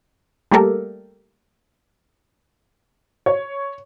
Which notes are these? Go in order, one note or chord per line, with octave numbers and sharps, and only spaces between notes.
G3 A3 A#3 G4 A4 A#4
C#5